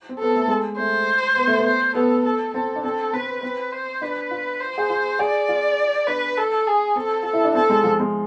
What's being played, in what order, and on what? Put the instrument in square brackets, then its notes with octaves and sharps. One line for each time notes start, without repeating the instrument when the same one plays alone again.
[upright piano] C4
[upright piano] B3 [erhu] A4
[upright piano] A3
G#3
[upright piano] A3 [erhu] C5
[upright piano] B3
A3
B3
[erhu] C5
[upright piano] B3 [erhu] A4
[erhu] A4
[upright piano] C4 [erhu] A4
[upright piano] D4
[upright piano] C4 [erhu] A4
[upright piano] C4 [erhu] B4
[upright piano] C4 [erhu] B4
[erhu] C5
[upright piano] D4 [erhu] B4
[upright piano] F4
[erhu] C5
[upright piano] G#4
F4
[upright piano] G#4 [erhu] D5
[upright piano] F4
[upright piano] D4 [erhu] B4
[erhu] A4
G#4
[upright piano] C4 [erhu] A4
[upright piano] F4 [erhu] A4
[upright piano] E4
D4
[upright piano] C4 [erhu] A4
[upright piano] G#3
F3
G#3